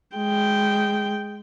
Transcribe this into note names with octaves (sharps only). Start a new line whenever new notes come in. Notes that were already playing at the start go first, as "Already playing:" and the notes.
G#3 G5